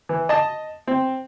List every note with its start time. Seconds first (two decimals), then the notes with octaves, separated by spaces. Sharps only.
0.09 E3
0.29 D#5 A5
0.88 C4